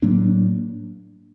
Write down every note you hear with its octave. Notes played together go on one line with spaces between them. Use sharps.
A2 F#3 A#3 D4